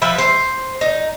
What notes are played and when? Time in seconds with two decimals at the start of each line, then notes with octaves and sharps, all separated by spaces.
0.02 F3 B4 E5
0.18 C5
0.81 D#4